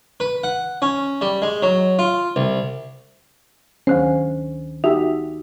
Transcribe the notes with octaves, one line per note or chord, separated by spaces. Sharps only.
B4
F#5
C#4
G3
G#3
F#3
F4
C2
D2 D#3 C#4 C5
D#4 F#4 G4 E5